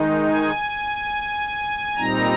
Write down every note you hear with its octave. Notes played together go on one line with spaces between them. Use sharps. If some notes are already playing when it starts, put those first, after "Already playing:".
Already playing: D#3 G#3 D#4
G#5
A#2 G3 C4 D#4 A#5